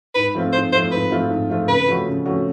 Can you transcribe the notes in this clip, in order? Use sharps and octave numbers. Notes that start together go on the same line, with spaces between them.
G#2 B4
F3 A3 C4 F4
G#2 C5
F3 A3 C4 F4 C5
G#2 B4
F3 A3 C4 F4
G#2
F3 A3 C4 F4
C#3 B4
F3 A3 C#4 F#4
C#3
F3 A3 C#4 F#4